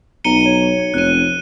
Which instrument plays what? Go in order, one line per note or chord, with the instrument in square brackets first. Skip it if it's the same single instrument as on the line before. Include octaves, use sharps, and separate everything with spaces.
[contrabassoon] B1 [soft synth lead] A#5 [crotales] C#7 D#7 G7
[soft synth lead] C#5
[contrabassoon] F1 [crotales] F#6 D#7